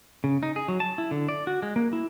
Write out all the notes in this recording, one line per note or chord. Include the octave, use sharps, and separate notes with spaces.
C#3
D#4
G#4
F#3
A5
E4
D3
D5
F#4
G#3
A#3
E4